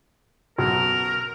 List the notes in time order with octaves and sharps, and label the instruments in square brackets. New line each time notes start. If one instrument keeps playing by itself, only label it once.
[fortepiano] B1 F#2 F#3 [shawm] A#4